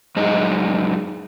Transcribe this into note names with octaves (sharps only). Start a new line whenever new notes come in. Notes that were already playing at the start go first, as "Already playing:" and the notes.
F#2 G#3 D#4